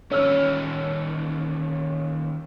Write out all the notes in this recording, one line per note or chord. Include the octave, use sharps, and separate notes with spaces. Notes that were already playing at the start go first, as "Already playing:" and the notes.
D#2 C#4 C#5 E6 F6